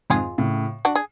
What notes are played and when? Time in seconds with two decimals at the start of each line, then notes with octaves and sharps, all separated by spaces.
0.10 F2 G#2 F4 G#4
0.38 A2 C#3
0.85 D4 F#4
0.95 G#4